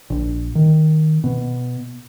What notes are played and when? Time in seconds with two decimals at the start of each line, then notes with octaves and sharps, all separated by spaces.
0.10 A#1
0.55 D#3
1.24 B2